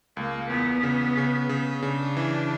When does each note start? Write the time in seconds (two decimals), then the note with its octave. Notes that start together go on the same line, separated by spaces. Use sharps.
0.17 C#2 A#3
0.50 E2 B3
0.83 C#3
1.17 C#3
1.49 C#3
1.82 C#3 D4
2.17 E3